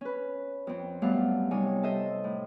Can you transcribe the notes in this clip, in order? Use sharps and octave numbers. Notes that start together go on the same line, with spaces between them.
C#4 B4
F2 C4
F#2 G3 A3 B3 F5 F#5
C3 G3 D#4 C#5 G#5
A4 C5 D#5 E5 A5
A2